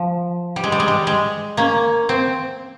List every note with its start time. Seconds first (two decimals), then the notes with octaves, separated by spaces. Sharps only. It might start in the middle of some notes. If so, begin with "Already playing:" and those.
Already playing: F3
0.56 G3
0.64 G#3
0.72 G3
0.80 G#3
0.88 G3
1.07 G#3
1.57 A#3 C#4
2.09 C4